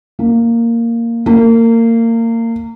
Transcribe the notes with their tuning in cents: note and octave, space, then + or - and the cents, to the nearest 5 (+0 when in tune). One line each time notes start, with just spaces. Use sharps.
A#3 -10
A#3 -30